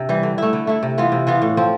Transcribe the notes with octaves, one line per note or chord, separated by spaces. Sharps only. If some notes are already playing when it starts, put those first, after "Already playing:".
Already playing: C3 D4
E3 G3
D3
A3 E4
D3
A3 E4
C3
E3 B3 F4
C3
E3 B3 F4
A2
F3 C4